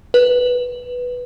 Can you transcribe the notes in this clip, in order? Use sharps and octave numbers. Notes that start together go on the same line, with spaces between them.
B4